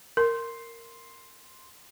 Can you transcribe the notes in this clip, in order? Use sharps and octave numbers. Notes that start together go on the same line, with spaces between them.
A#4 C6